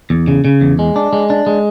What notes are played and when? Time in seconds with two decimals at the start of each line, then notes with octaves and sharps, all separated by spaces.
0.10 E2
0.27 C#3
0.45 C#3
0.61 E2
0.79 G#3
0.96 D4
1.13 G#3
1.30 D4
1.47 G#3